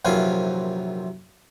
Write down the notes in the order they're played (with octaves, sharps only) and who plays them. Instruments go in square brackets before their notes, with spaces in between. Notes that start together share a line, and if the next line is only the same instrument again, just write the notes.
[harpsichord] A#1 F#2 C3 E3 F4 G#5